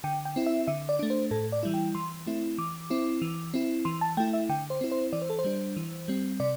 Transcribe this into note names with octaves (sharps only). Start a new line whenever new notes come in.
D3 G5
G5
C4 E4
E5
D3 E5
D5
A3 D4
C5
A2 A4
D5
E3 G3 E4
G5
E3 C6
A3 C4 E4
E3 D6
C4 E4
E3
C4 E4
E3 C6
A5
A3 E4 G5
E5
D3 G5
C5
C4 E4
C5
E3 D5
C5
A4
C5
G3 D4
E3
G3 C4
C3 D5